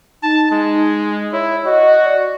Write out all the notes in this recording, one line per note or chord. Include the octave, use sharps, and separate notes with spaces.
D#4 A5
G#3
E4 C#5
F#4 D#5
D5